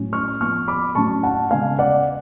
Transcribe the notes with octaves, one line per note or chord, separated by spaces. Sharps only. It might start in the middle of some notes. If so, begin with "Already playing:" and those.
Already playing: A2 F#3 C#4
C#6 F6
F3 B3 C#6 F6
B5 D6
A2 F#3 C#4 A5 C#6
F#5 A5
C#3 G#3 B3 F5 G#5
D5 F#5